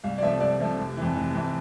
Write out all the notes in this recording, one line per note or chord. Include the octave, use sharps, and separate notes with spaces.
C2 F5
D5
C3 F3 A3 E5
C2 D5
C3 F3 A3
F1
F2 E3
F1
F2 E3